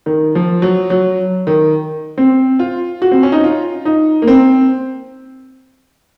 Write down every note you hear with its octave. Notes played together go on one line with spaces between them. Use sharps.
D#3
F3
F#3
F#3
D#3
C4
F4
F#4
C4
C#4
D#4
F4
D#4
A#3
C4